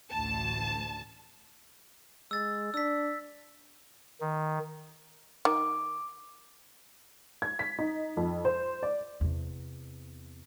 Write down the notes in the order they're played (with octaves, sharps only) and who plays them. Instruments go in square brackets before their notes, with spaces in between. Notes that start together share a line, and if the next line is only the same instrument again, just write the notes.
[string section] A1 D2 A5
[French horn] G#3 [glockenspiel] E6 A6
[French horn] D4 [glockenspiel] E6 B6
[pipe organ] D#3
[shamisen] D#3 [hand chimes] D6
[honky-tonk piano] G#6
B6
D#4
F2
C5
D5
[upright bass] E2 C3